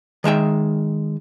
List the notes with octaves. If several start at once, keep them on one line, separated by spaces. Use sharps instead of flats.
D#3 G#3 E5 G5